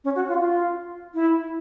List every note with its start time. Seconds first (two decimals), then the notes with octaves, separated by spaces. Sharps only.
0.04 C#4
0.16 F#4
0.29 F4
0.40 F4
1.14 E4